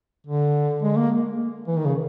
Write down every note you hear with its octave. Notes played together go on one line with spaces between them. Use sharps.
D3
G#3
A#3
E3
D#3
C#3